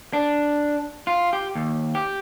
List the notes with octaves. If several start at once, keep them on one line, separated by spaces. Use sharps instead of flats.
D4
F4
G4
D#2
G4